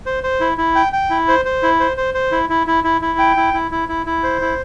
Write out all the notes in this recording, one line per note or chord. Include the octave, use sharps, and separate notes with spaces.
C5
C5
E4
E4
G5
G5
E4
C5
C5
E4
C5
C5
C5
E4
E4
E4
E4
E4
G5
E4
E4
E4
E4
E4
C5
E4